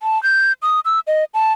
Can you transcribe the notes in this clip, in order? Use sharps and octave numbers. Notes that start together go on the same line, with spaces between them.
A5
G6
D#6
E6
D#5
A5